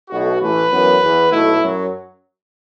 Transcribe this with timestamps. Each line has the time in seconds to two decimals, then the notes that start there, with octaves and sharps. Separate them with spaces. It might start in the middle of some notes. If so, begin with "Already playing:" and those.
0.10 B1 B2 A3 F#4
0.40 A1 A2 E3 A3 B4
0.71 F#2 E3 B3
1.01 E2 E3 B3
1.32 B1 B2 A3 E4
1.62 F#2 F#3